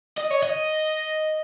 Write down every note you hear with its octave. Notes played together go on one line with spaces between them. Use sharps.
D#5
C#5
D#5